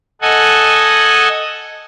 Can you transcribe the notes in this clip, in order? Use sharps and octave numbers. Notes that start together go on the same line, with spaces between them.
A4 D#5 F#5 G#5